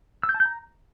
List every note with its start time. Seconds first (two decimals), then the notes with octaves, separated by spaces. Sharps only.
0.23 E6
0.29 G6
0.34 A5
0.40 G6
0.46 A#5